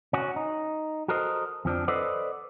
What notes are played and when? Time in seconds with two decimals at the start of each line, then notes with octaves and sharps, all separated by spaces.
0.13 C#4 F#4
0.36 D#4
1.08 F#4 A4 A#4 C5 D#5
1.65 F2 F3 D4
1.88 A4 B4 C5 D5 D#5 F#5